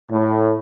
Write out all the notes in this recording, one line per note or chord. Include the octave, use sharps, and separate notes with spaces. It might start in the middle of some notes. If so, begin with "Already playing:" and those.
A2